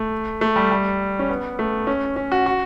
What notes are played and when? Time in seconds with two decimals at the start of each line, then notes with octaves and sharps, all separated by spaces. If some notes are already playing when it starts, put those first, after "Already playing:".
Already playing: A3
0.41 A3
0.56 G3
0.71 G3
1.19 C#4
1.29 B3
1.59 A3
1.87 C#4
2.16 C#4
2.32 F#4
2.46 F#4